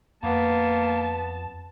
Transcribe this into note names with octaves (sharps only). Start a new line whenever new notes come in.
F2 A#3 B3 A5